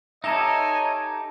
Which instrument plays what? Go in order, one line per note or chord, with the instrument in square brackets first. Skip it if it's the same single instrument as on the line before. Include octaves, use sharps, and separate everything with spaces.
[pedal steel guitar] D#4 G4 A4 [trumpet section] C#5 D#5 G#5 [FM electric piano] E5 A#5